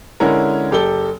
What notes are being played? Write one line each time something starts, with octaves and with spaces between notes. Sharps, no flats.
D3 G#3 C#4 E4 A#4
F#1 G4 A4 G7